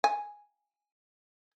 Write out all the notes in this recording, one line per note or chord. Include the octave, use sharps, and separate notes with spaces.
G#5